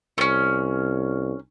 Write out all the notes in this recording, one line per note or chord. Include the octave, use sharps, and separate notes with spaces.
C2 A3 C#4